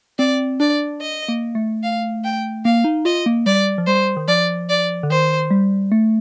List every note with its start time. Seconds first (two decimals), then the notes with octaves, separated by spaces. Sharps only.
0.18 C4 D5
0.60 D4 D5
1.01 D#5
1.28 A#3
1.55 A3
1.83 F5
2.24 G5
2.65 A#3 F5
2.84 D#4
3.05 F4 D#5
3.26 A#3
3.46 G3 D5
3.78 F3
3.87 G3 C5
4.17 D#3
4.28 F3 D5
4.69 D5
5.03 D3
5.10 D#3 C5
5.51 G3
5.92 A3